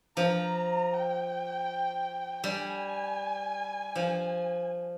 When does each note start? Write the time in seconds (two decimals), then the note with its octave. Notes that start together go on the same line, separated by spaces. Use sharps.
0.17 F3 A#5
0.93 G5
2.44 G3 G#5
3.96 F3